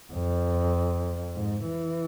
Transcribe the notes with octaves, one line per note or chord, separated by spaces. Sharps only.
F2
G#2
E3